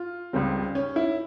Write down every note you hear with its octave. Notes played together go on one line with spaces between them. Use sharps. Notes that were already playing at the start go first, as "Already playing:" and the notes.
Already playing: F4
C#2 C#3 G3 C4
C#4
E4